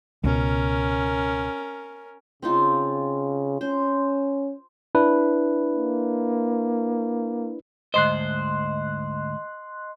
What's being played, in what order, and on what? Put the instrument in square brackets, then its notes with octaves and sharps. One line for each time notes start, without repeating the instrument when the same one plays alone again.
[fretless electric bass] C#2 B2 [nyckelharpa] C#4 A#4
[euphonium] C#3 [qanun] C4 D#4 F4
[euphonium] C#4 [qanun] C5
[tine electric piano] D4 E4 B4
[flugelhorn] A#3
[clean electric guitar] D2 G#2 C5 [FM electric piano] D#5 C6 F#6